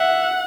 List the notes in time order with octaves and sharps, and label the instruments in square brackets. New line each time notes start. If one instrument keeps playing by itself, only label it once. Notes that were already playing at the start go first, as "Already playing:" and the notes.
Already playing: [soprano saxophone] E5 [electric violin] F#5